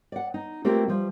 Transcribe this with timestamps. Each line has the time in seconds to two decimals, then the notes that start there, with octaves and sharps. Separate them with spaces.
0.12 D5 F#5
0.34 D#4
0.65 A3 A#3 C4 F4 G4
0.88 F3 G3